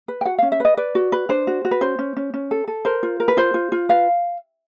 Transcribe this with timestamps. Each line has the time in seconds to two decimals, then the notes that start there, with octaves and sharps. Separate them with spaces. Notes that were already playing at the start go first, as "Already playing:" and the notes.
0.08 B4
0.21 G5
0.25 F#4 F#5
0.38 C#4 F5
0.52 E5
0.60 B4 D#5
0.77 B4 D5
0.95 F#4
1.12 B4
1.29 D4 C5
1.47 F#4
1.65 F#4
1.71 B4
1.81 C#4 C5
1.99 C#4
2.17 C#4
2.34 C#4
2.51 A4
2.68 A4
2.85 A#4 C5
3.03 F4
3.20 A#4
3.28 B4
3.37 F4 C5
3.54 F4
3.72 F4
3.89 B4 F5